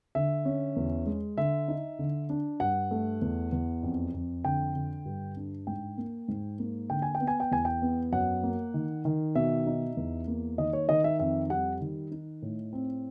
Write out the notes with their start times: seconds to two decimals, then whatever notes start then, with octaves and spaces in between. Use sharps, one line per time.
0.15 D3 E5
0.45 C#4
0.76 E2
1.06 G#3
1.37 D3 E5
1.68 D#4
1.99 D3
2.30 D4
2.60 G2 F#5
2.91 A3
3.22 E2
3.52 E2
3.83 F2
4.14 F2
4.44 D3 G5
4.75 D3
5.06 G2
5.36 D4
5.67 G#2 G5
5.98 A#3
6.28 G#2
6.59 A#3
6.90 D3 G5
7.02 G#5
7.15 G5
7.20 B3
7.27 G#5
7.40 G5
7.51 E2 G#5
7.65 G5
7.82 B3
8.12 F#2 F#5
8.43 A#3
8.74 D#3
9.05 D#3
9.35 B2 E5
9.67 D#4
9.97 E2
10.27 A#3
10.58 D#3 D#5
10.73 C#5
10.89 D#3 D#5
11.04 E5
11.20 F2 E5
11.50 G3 F#5
11.81 D#3
12.11 D#4
12.42 A2
12.73 C4